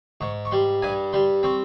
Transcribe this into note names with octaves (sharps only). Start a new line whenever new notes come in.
G#2 C#6
C#6
G3 C6
G2 G#5
G3 C6
C4 C#6